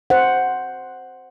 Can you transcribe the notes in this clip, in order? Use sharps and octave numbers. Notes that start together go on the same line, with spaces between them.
C5 F#5